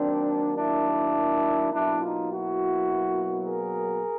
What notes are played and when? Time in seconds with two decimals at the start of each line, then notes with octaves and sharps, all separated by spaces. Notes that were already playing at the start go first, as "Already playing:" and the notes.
Already playing: D#3 F#3 A#3 C4 D4
0.58 D4 E4
1.73 B2 F#3 A#3 D4 E4
2.02 D#4 F4
2.31 E4 F#4
3.46 G#4 A#4